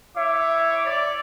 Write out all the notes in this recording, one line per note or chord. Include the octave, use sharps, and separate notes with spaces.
E4 C#5 E5 D6
D5